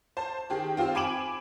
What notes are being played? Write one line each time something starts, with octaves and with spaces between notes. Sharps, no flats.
C5 A5
D#3 G4 G#4
C4 F4 G4 C5
G#5 B5 D6 D7 E7 F#7